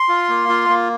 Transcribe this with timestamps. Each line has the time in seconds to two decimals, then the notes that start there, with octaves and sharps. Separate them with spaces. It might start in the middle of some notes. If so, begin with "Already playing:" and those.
Already playing: C6
0.09 F4
0.29 A#3
0.49 F4
0.69 A#3